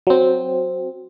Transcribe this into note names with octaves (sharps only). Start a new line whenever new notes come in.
F#3 C4